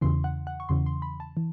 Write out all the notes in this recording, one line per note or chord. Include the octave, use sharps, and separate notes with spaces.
E2 C#3 E3 C6
F#5
F#5
C#6
E2 C#3 E3 C6
C6
B5
A5
E3